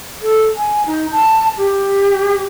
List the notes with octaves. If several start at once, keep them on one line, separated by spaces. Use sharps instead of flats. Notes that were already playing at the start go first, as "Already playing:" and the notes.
A4
G#5
D#4
A5
G4